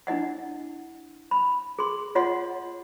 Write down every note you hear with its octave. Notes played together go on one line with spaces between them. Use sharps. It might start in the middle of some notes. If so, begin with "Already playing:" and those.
D4 E4 D#5 F#5
B5
G#4 C6
F4 C#5 D#5 F#5 C6